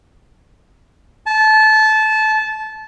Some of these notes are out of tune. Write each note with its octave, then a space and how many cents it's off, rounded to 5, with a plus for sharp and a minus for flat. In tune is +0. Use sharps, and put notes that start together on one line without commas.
A5 -20